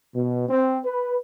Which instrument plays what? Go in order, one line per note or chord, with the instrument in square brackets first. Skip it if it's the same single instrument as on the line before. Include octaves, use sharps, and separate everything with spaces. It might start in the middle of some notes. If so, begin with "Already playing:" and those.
[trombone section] B2
C4
B4